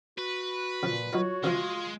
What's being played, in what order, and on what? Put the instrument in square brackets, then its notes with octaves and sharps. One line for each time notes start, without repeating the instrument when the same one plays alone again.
[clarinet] F#4 [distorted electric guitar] B4
[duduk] A#2 [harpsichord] C#3 F3
[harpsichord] F#3 D#4 F4 [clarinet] F#4 [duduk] C#5
[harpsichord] C#3 E3 F3 [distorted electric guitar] G#3 [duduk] F4